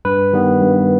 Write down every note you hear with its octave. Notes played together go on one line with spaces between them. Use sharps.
G2 B4
D#3 G3 B3
G2